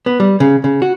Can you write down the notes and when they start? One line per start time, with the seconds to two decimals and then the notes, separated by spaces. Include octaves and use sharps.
0.06 B3
0.20 G3
0.40 C#3
0.64 C#3
0.82 F#4